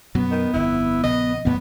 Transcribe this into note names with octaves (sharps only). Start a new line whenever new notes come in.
F#2 B2 F#3 B3
D#3
G1 F2 E4
A#1 C#3 D#5
A1 F#2 G3 B3